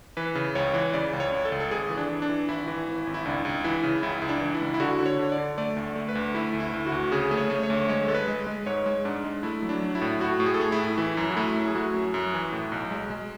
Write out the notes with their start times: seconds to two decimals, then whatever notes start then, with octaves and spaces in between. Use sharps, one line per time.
0.17 E3 B4
0.35 C#3
0.55 C#2 C#5
0.74 E3
0.94 C#3 D5
1.13 C#2
1.20 C#5
1.32 C#2
1.45 A4
1.52 C#2
1.60 A4
1.71 G#1 G#4
1.90 E3
1.97 D4
2.10 E3
2.22 D4
2.29 E3
2.49 G#1 E4
2.68 E3
2.88 G#1
3.07 G#1
3.14 E4
3.25 C#2 D4
3.45 C#2
3.64 E3 E4
3.83 C#3
4.03 C#2 E4
4.22 C#2
4.29 D4
4.41 E3
4.55 E4
4.61 C#2
4.74 E4
4.80 D3 F#4
4.99 D3
5.06 C#5
5.19 D3
5.32 D5
5.38 D3
5.58 A3 D5
5.77 D2
5.95 A3
6.09 B4
6.15 D2
6.35 A3 E4
6.54 D2
6.60 E4
6.73 D2
6.87 F#4
6.92 D2
7.12 C#3 G#4
7.31 A3
7.37 C#5
7.50 A3
7.63 C#5
7.70 D2
7.89 G#3 C#5
8.08 G#3 A4
8.14 B4
8.28 G#3
8.47 G#3
8.66 G#2 C#5
8.86 G#3
9.05 G#2 D4
9.24 G#3
9.43 A3 E4
9.63 F#3
9.69 D4
9.82 F#3
9.95 E4
10.01 A2
10.20 A2 F#4
10.40 A2
10.46 G#4
10.54 A4
10.60 A3 G#4
10.72 E4
10.79 A2
10.97 E3 E4
11.17 F#2
11.30 F#4
11.37 A3 E4
11.56 F#2
11.67 G#4
11.75 A3 F#4
11.94 F#2
12.14 F#2
12.33 E3
12.53 A2
12.72 B1
12.91 G#3
13.10 G#3